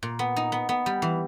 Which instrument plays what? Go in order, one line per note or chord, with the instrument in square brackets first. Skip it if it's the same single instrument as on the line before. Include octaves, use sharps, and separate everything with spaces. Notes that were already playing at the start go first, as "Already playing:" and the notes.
[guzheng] A#2
B3
D#4
B3
B3
G3
E3